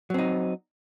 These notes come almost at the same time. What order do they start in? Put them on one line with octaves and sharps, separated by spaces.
F#3 C4 D#4